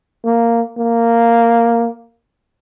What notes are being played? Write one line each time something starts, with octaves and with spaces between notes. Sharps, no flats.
A#3
A#3